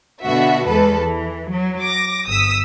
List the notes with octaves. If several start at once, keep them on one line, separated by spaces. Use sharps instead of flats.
B2 D3 F#4 E5
E2 G#3 A4 B4
E3
F#3
D6 A#6
G1 D#6 E6 B6